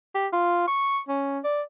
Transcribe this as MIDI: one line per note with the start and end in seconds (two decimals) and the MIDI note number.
0.15 0.27 67
0.33 0.64 65
0.67 0.99 85
1.08 1.39 61
1.44 1.62 74